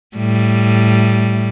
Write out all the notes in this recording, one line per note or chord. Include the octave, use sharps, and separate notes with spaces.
A2 G3